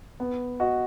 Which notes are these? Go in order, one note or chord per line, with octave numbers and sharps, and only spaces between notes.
B3
F#4 D#5